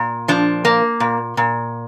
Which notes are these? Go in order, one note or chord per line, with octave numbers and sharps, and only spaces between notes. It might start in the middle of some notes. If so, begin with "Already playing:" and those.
Already playing: A#2
F3 D4
A#3
A#2
A#2